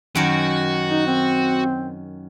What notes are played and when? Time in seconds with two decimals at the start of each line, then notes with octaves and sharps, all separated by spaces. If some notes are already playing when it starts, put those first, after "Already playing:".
0.15 F#2 D#3 F#3 F#4
0.90 D#4
1.06 C4